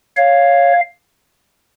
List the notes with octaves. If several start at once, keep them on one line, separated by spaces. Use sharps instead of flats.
C#5 F5